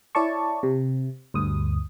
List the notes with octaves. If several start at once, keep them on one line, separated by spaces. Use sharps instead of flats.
E4 C#5 D5 A5 C#6
C3
D2 G2 D#6